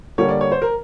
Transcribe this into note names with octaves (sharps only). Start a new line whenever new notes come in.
D3 G3 A#3 C#5
D5
C#5
C5
A#4